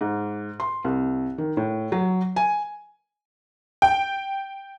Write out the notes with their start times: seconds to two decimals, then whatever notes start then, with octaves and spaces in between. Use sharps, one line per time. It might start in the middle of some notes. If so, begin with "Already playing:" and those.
0.01 G#2
0.60 C6
0.84 C2
1.38 D#3
1.57 A2
1.92 F#3
2.36 G#5
3.82 G5